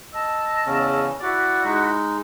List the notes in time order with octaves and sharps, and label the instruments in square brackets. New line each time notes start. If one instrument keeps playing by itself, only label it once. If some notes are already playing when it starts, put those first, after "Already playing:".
[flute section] D#5 A5 E6
[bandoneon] E2 C#3 C#4
[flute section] E4 F#4 [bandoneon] D5
[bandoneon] G#3 D#4